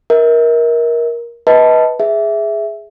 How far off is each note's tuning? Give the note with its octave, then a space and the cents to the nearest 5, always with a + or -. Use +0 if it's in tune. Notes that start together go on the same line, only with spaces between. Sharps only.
A#4 +15 E5 -40
B4 -10 D#5 +30 A5 +0
G#4 +0 E5 +0